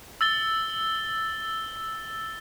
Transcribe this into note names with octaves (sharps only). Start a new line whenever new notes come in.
E6 A6 G7